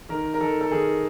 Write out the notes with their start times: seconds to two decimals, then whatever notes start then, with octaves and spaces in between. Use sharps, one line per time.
0.09 D#3 A#4
0.34 A#4
0.40 D#3 A4
0.61 A4
0.71 D#3 G#4